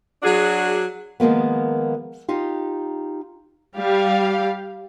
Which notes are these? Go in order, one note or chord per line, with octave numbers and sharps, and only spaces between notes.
F#3 D4 F#4 G#4
D#3 F3 G#3 A#3 B3
D#4 F4 G4
G3 G4 F5